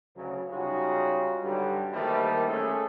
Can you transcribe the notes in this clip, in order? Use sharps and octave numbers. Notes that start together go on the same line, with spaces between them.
D2 C#3 F#3
C#3 G3 D#4 F4 F#4 G#4
G2 D3 F#3 G3
D#3 E3 G3 A3 A#3 C5
A3 C#4 G#4 A4